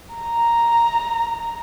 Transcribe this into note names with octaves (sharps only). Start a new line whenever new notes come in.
A#5